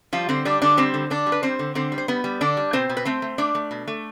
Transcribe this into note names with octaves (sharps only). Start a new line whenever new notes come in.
F3 G3 F4
D3 C4 C5
G3 D4 D5
D3 D4 D5
G3 C4 C5
D3
D3 D4 D5
G3
B4
G3 C4 C5
D3
D3 C4 C5
G3
C5
G3 B3 B4
G3
D3 D4 D5
G3
B2 C4 C5
B2
B4
A3 C4 C5
A3
A3 D4 D5
A3
B2
A3